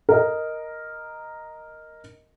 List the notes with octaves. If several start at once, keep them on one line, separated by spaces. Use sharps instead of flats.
A#4 D#5